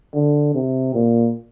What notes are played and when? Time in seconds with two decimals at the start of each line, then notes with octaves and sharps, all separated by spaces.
0.14 D3
0.54 C3
0.94 A#2